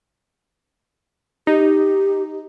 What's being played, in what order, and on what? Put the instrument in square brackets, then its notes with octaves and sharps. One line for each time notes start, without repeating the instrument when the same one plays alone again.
[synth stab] D#4 [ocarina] G4